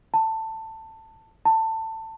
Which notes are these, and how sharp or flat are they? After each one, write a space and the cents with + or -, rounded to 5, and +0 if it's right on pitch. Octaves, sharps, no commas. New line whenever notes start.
A5 +15
A5 +20